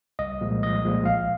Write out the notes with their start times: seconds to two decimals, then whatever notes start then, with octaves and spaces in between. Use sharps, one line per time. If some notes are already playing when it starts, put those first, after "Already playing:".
0.19 C2 D#5
0.41 A#2 F3 G#3
0.63 C2 D#5
0.84 A#2 F3 G#3
1.05 A#1 F5